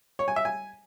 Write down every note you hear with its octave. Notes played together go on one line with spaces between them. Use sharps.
C#5
G#5
E5
G#5